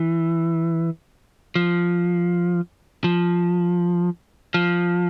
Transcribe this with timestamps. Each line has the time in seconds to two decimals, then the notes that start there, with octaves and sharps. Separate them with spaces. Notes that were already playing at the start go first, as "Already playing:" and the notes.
Already playing: E3
1.55 F3
3.04 F3
4.54 F3